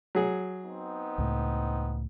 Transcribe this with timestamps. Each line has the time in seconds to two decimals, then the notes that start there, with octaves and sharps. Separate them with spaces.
0.15 F#3 G#4
0.62 B3 C4 D#4
1.18 C#2 A2